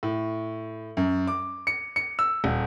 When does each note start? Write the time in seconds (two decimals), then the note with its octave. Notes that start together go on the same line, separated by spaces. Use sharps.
0.03 A2
0.97 F#2
1.27 D6
1.67 C#7
1.96 C#7
2.19 E6
2.44 D#1